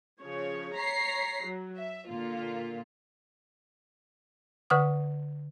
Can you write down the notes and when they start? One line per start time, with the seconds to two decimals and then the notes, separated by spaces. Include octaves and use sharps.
0.21 C#3 F3 C#5
0.76 C#5 A#5 B6 C7
1.44 F#3
1.77 E5
2.08 A#2 D3 A#3 F4
4.70 D3 B4 F#5 C#6 D#6